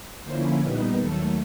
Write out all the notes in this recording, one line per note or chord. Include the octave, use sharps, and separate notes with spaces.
D3 F3 A#3 C#4 E4 C5
A#2 G3 B3 D#4 B4
D#2 D#3 F#3 A3 A4